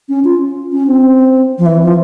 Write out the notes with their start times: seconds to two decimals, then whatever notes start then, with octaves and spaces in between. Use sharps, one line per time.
0.09 C#4
0.25 F4
0.72 C#4
0.87 C4
1.58 F3
1.66 E3
1.82 F3